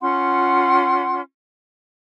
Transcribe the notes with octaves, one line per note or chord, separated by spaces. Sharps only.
C#4 F4 F#5 C6